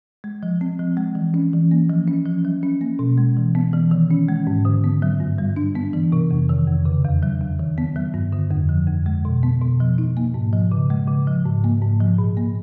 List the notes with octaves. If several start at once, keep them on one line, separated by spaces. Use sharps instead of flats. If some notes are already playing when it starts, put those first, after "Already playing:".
G#3
F3
C4
F3
G#3
E3
C#4
E3
A#3
F3
C#4
F3
F#3
C#4
A#3
B2
G#3
E3
B3
E3
D#3
C#4
G#3
G#2
D3
B3
F#3
G2
G3
D4
B3
E3
C3
F2
D#3
F2
C#3
E2
F#3
E2
D#3
B3
F#3
G2
D3
F2
F3
F2
G#3
B2
B3
B2
F3
D#4
A#3
G#2
F3
C#3
G#3
C#3
F3
G#2
A#3
G#2
F3
A#2
A#3